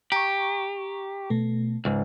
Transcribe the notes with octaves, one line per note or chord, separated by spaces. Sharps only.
G4 A#5 C#6
B2 A3
C#2 G#2